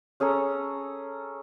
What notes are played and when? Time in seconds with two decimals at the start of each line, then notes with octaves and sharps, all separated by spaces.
0.20 C#4 G#4 A4 A#5